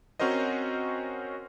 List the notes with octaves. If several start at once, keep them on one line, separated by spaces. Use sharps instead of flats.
C4 C#4 F#4 A#4 C5 D#5